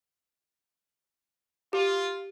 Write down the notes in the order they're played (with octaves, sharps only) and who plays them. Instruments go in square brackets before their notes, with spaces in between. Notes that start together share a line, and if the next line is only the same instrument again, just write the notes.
[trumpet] F4 [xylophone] G4